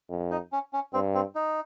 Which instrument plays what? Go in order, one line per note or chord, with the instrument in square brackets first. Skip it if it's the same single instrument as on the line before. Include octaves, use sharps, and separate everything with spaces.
[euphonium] F2
[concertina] D#4
C#4
C#4
[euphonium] G2 [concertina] C4
[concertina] C4
D#4